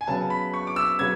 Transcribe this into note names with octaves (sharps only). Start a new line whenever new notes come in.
G#5
C#3 F#3 B3 A5
B5
C#6
D6
E6
C#3 F#3 B3 G#6